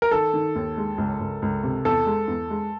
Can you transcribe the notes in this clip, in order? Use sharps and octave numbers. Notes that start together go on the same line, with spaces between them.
A#4
D#3 A4
D#3
D#2
G#3
C#2
C#2
C#2
C3
E2 A4
G#3
E2
G#3